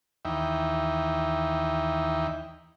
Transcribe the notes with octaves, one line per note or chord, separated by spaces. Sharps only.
D#2 E3 D#4 E5 G5